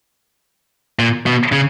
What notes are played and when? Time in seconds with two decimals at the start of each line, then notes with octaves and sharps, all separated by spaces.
0.99 A#2
1.26 B2
1.52 C#3